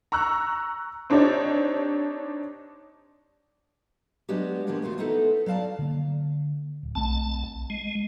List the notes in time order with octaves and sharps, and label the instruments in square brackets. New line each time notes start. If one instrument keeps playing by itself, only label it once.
[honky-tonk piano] A#5 C#6 E6 F#6
C4 D4 D#4 G4 C#5 D5
[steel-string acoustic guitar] F#3 G#3 B3 D4 F#4 G4
D#3 F3 G#3 A#3 B3 D4
D#2 A3 A#3 F4 F#4
A3 B3 D#4 E4 F#4 A4
F#3 D5 F5 A5 A#5
[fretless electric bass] D3 A#3
D1
[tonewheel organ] B1 A5 [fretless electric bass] A3 C4
[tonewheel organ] G#3